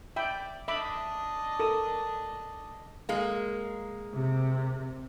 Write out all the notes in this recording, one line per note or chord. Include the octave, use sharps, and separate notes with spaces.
D5 E5 G5 B5
D4 D#5 E5 B5 D6
A4 A#4 D#6
G#3 A#3
C3